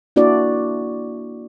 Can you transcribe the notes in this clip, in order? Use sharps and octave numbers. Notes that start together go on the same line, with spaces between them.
A#3 D4 E4 F#4 D5